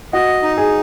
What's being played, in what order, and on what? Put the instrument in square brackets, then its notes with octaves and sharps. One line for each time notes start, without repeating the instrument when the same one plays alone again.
[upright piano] F#4 [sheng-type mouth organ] D#5
[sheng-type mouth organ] D#4
[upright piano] G#4